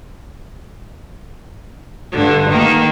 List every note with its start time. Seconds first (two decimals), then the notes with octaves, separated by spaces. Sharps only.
2.12 G2 D3
2.49 D#3 A#3